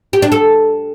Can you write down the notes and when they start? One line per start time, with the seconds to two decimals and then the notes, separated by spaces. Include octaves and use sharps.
0.13 G4
0.22 D4
0.32 A4